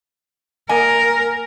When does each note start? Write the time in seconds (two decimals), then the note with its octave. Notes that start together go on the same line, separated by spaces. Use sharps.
0.69 A#3 A#4 D#5 G#5